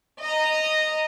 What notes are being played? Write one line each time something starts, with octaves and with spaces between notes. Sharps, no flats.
D#5 A#5